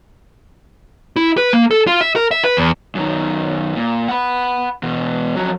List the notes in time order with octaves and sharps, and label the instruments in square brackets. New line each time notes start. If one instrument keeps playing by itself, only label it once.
[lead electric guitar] E4
B4
A#3
A4
F4
E5
A#4
E5
B4
E2
[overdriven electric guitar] F#2 D#3
A#2
F#5 B5
E2 B2
F2 F#3